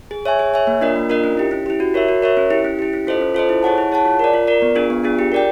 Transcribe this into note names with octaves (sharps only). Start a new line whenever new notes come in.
G#4
C#5 E5 G#5
G#4
C#5 E5 G#5
A#3
D4 F4 A#4 D#5
A#3
D4 F4 A#4 D#5
C#4
E4 G4
C#4
E4 G4
F#4
A#4 C#5 E5
F#4
A#4 C#5 E5
C#4
E4 G4
C#4
E4 G4
C#4
F4 A4 C5 D#5
C#4
F4 A4 C5 D#5
E4
G#4 C#5 F#5 A5
E4
G#4 C#5 F#5 A5
F4
A#4 D5
F4
A#4 D5
B3
D4 F4 G#4
B3
D4 F4 G#4
G4
A#4 D5 G5